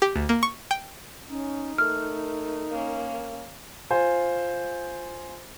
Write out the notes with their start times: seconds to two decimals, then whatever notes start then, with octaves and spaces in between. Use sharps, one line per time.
0.02 G4
0.16 D2
0.29 A#3
0.43 C#6
0.71 G5
1.30 C#4 D#4
1.78 A3 A#4 F6
2.71 A#3 C#4
3.90 F4 C5 G#5